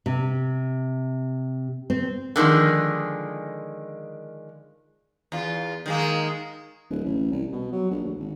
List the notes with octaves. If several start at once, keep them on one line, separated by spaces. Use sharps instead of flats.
C3
C4
D3 D#3 F3 G#3
E2 F4
D#3 G#3 A#3
D1
A1
C2
B2
F#3
A#1
D2
G#1